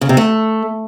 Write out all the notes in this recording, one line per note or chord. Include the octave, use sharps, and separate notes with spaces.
C#3
C3
A3